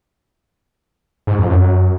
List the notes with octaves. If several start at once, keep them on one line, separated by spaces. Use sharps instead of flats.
G#2
F2
F#2